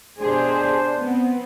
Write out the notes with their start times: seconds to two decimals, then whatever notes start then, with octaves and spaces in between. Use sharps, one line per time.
0.19 B2 D4 G4 G#4 C5
0.97 B3 C4